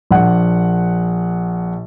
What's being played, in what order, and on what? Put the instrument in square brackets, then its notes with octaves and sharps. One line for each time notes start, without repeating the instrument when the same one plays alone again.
[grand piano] A#1 F#5